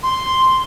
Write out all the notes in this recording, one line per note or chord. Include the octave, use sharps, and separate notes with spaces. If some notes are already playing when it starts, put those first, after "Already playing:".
C6